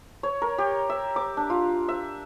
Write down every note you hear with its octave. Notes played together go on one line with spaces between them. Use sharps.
C#5
A#4
G4
E5
D6
D4
F4
E5